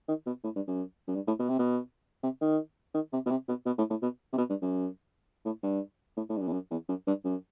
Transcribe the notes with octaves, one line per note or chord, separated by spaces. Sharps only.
D#3
B2
A2
G2
F#2
F#2
G2
A2
B2
C3
B2
C3
D#3
D#3
C3
B2
C3
B2
B2
A2
A2
B2
C3
B2
G2
F#2
A2
G2
A2
A2
G2
F#2
E2
F#2
E2
F#2
G2
F#2